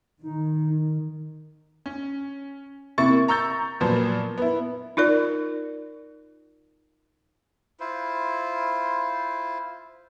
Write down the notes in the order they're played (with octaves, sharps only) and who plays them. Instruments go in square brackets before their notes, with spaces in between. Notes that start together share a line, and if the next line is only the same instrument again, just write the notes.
[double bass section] D#3 [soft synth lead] D#4
[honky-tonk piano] C#4
C3 A#3 E4 C#6 A6
A#5 C#6 E6 G6 A6
A#2 F3 F#3 B3
B3 E4
[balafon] D#4 F4 A#4 D5
[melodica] E4 F4 C5